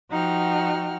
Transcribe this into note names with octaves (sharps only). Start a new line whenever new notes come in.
F3 D#4 F#4 F#5 G5 F6